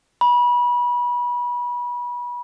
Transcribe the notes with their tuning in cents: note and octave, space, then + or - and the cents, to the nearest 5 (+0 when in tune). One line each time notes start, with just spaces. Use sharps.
B5 -25